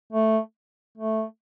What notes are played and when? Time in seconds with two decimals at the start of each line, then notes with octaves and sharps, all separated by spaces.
0.13 A3
0.98 A3